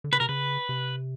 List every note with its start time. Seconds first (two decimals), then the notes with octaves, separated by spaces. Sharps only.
0.04 D3
0.12 C#3 B4
0.20 C3 A#4
0.29 C#3 B4
0.69 C3